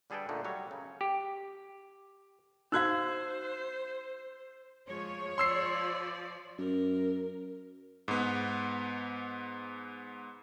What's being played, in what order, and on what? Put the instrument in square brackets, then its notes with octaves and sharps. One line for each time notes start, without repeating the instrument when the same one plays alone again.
[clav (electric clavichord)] D3 G3 G#4 A4 B4 G5
A#2 D3 A3 D#4
F#3 G3 C#5
C#3
G4
[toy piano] D#4 F#4 F5 [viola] C5 [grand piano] E6 F#6 G#6
[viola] F3 G#3 [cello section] C#5
[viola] F3 D5 [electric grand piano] C6 E6 C7
[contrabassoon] F#2 [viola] A#4
[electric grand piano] G#2 B3